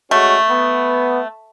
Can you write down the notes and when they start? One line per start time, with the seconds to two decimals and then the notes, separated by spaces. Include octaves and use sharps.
0.11 G#3 A3 C#4 F#4
0.50 B3